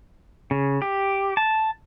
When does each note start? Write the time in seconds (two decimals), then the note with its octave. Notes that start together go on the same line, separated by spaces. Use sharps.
0.51 C#3
0.82 G4
1.37 A5